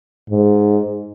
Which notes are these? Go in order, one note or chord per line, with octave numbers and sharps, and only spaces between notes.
G#2